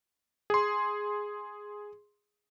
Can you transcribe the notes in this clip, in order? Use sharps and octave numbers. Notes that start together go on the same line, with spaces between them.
G#4 C6